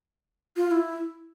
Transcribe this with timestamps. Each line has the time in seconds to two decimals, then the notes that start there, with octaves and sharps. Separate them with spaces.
0.57 F4
0.67 F4
0.71 E4